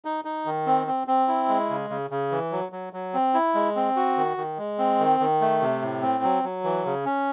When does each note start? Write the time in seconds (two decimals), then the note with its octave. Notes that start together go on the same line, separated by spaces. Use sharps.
0.05 D#4
0.25 D#4
0.46 D#3
0.66 C4
0.87 C4
1.07 C4
1.28 E4
1.49 G#3
1.70 C#3
1.90 C#3
2.10 C#3
2.31 E3
2.52 F#3
2.72 F#3
2.93 F#3
3.14 C4
3.34 E4
3.55 G#3
3.76 C4
3.96 F#4
4.17 D#3
4.37 D#3
4.58 G#3
4.79 C4
4.99 D#3
5.20 D#3
5.41 A3
5.61 C3
5.82 A2
6.02 C4
6.23 F#3
6.44 F#3
6.64 E3
6.85 C#3
7.05 C#4